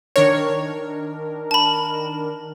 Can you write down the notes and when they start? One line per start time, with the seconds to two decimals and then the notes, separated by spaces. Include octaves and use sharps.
0.16 D#3 D4 A#4 C#5
1.51 A5 B5